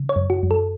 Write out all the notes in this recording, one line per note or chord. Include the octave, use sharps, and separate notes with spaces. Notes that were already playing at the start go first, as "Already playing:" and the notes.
Already playing: C#3
C#5
F#2
F#4
F#2
A4